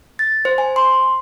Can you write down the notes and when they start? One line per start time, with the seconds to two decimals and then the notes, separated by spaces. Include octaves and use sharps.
0.19 A6
0.45 C5
0.58 G#5
0.76 C6